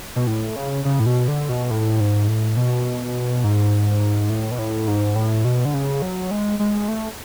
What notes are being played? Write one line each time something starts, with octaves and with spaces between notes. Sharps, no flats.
B2
A2
C#3
C#3
A2
B2
D3
B2
A2
G#2
A2
B2
G#2
A2
B2
A2
G#2
A2
B2
D3
C#3
F#3
G#3
G#3
A3